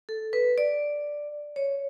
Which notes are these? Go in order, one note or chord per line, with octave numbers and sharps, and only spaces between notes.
A4
B4
D5
C#5